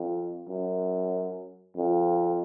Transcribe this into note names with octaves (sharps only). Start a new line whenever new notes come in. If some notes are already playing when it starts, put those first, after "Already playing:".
Already playing: F2
F#2
F2